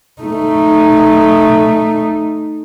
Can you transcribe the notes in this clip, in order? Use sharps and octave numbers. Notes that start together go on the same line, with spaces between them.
A3 D#4